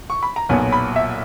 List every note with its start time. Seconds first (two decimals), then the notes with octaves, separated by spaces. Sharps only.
0.10 C#6
0.23 B5
0.36 A#5
0.49 B1 A#2 F#3 B3 G#5
0.72 B5
0.96 E5